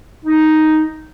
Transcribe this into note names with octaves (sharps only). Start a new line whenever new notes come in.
D#4